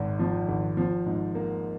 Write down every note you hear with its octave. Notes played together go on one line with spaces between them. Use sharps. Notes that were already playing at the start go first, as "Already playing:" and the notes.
Already playing: G#1 G#2
F3
G#1
F3
G#2
A#3